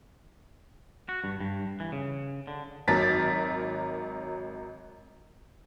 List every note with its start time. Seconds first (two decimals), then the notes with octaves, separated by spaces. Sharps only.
1.09 F#4
1.24 G2
1.40 G2
1.80 E3
1.92 C#3
2.47 D3
2.88 G#1 F#3 A#4 A6 B6